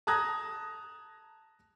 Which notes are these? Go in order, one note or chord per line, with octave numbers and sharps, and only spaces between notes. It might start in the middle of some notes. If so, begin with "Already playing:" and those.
A5 A#5 D#6 F#6 G#6 A#6